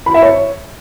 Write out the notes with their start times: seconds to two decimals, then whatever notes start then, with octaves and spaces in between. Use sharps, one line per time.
0.06 B5
0.14 E5
0.22 C#5